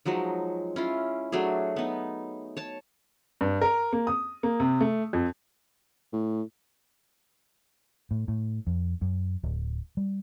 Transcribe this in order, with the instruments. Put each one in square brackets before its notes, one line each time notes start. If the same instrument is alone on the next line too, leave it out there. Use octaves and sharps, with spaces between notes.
[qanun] F3 F#3 G#3 D#4
C#4 E4 F4
F#3 A3 D4 G#4
B3 D#4
C#5 A5
[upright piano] G2
A#4
A#3
D#6
A#3
C3
A3
F2
[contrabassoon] A2
[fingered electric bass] A2
A2
F2
F#2
D1
G3